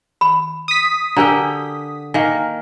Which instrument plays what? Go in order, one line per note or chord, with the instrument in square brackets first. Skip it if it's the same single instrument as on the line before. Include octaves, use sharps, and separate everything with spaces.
[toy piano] B5
[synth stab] D#6 B6
[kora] D3 G4 G5 [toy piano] A#4 G#5 A#5
[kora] D#3 A#3 [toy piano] G#5